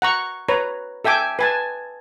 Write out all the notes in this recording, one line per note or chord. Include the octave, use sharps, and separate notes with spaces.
F#5 A#5 C#6
B4 C#5 A#5
A4 E5 G5 G#5 D6
B4 G#5 A5